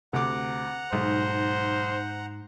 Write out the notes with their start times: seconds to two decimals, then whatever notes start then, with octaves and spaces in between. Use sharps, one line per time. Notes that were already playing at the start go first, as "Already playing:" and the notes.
0.13 D2 C3 F#5 A#5 D6
0.93 B1 G#2 C5